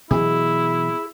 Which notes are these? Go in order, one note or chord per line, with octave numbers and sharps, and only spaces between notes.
B2 E3 F#3 E4 G#4